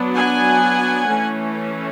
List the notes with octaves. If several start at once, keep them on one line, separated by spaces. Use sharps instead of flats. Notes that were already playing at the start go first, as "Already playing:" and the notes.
Already playing: F#3 B3 D4
F#5 G#5
E3 A3 C#4